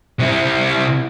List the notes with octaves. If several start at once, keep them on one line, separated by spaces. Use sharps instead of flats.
C3 E4